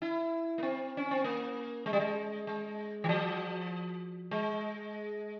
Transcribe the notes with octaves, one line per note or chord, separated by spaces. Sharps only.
E4
A#3
C4
C#4
C4
A#3
G#3
G3
G#3
G#3
E3
F3
G#3